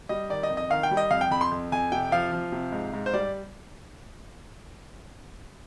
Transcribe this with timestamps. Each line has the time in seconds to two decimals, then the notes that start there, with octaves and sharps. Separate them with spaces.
0.09 G3 D#5
0.30 D#3 D5
0.43 D#5
0.50 F2
0.57 D#5
0.70 D#3 F5
0.83 G5
0.91 G3
0.97 D#5
1.10 F2 F5
1.21 G5
1.31 F2 B5
1.41 C6
1.51 F2
1.72 F2 G#5
1.92 C3 G5
2.12 F3 F5
2.32 F3
2.52 C3
2.72 G#2
2.93 G#2
3.06 C5
3.14 G3 D5